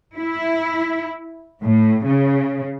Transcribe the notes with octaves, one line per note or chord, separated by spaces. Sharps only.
E4
A2
C#3